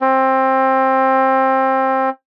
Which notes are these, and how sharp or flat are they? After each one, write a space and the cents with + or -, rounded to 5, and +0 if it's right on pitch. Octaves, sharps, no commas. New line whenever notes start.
C4 +20